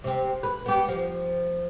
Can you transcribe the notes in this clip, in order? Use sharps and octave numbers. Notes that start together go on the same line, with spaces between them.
C3 C4
B4
B3 G4
F3